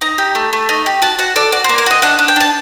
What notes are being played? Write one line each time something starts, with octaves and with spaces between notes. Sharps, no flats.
D#4 A#5
G4
A3
A3
D#4
G4
F#4 A5
F#4 F#5
A4 D5
F#4 D5
C5
A#3
A#4
F#4 D#5
D4 F#5
D4
G5
D4 A5